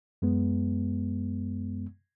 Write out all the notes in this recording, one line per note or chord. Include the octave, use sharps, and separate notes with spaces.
F#2 G#3 B3